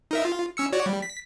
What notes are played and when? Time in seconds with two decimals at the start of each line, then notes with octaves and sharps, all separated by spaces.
0.11 D#4 A#4 E5
0.25 F4
0.57 C#4 E6 C#7
0.72 F#4 C#5 D5
0.86 G3
1.02 B6